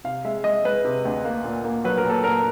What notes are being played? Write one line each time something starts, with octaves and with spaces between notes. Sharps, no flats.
C3 F5
G#3 E5
G#3 D#5
G#3 B4
C3
D2
A#3
A#2
A#3
F#3 B4
A#4
A#2
A4
A#2 A#4